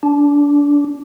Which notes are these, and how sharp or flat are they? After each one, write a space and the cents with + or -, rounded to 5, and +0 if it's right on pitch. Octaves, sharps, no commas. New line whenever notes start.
D4 -25